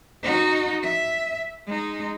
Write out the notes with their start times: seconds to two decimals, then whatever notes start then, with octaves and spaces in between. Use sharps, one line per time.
0.23 D#4 F#4
0.83 E5
1.67 G#3 D#4